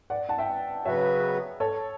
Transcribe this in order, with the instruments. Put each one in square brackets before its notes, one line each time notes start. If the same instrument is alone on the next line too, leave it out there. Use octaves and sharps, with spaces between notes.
[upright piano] D5 F#5
F#5 A5
E5 G5
[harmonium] C#3 F#3 B3 F#4 B4 [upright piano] C#5 E5
[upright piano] A4 C#5